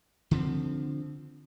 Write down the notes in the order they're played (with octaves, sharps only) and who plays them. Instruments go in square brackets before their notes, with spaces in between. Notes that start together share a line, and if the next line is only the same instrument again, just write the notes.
[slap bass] D3 F3 A#3 C4